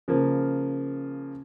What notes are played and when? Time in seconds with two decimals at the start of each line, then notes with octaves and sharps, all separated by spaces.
0.08 C#3 F3 A#3